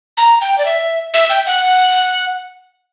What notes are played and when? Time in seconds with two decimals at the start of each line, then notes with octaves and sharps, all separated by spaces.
0.17 A#5
0.41 G5
0.58 D5
0.65 E5
1.14 E5
1.30 G5
1.46 F#5